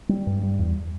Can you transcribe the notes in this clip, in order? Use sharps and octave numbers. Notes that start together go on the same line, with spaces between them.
G3
G2
G3
E2